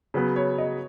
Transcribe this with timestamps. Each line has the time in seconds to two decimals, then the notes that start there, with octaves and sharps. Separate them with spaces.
0.14 C#3 F#3 B3 B4
0.36 C#5
0.58 D#5